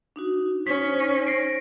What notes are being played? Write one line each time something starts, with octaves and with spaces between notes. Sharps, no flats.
D4 D#4 F#4
C#4 D#4 C5 B6
A#6 C7 D7